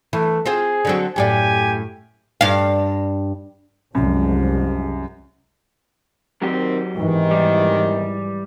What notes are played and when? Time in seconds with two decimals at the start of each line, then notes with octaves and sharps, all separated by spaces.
0.13 E3 A3
0.46 C4 F4 G#4 C5
0.85 D3 F#3 C4
1.16 F#2 A2 G4 D5 G#5
2.41 G2 F5
3.95 C2 F#2 F3 G#3
6.42 D#3 F#3 C4 G4
6.96 E2 G#2 C3 D#3 E3
7.31 G3